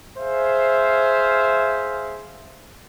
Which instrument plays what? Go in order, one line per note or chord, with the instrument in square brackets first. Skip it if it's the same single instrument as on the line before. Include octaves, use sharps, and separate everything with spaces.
[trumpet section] G#4 C5 E5 F5